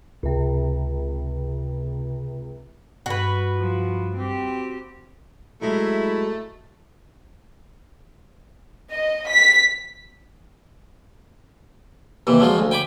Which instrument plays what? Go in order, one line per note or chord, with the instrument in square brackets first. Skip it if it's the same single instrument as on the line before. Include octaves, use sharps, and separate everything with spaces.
[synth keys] C#2 C3
[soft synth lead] G2 [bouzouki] F#4 B4
[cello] F3
C4 G4
[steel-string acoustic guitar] F#3 G#3 [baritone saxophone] A3 [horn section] E4
[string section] D#5
B6
[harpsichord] D#2 C3 E3
F3 F#3 G#3 F4
D2
G5 G#5 B5 D6